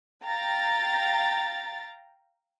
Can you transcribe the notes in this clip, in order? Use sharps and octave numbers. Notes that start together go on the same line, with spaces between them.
F5 G5 A#5 A6